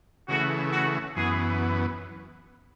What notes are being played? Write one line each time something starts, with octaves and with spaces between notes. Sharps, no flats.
C#3 E3 A3 F#4
F#4
F#2 E3 B3 G#4